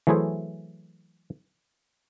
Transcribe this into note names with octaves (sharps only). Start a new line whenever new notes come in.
E3 F#3 A3 E4 G#4 C5